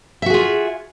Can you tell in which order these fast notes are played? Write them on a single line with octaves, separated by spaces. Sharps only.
E5 F#4 G#4 F4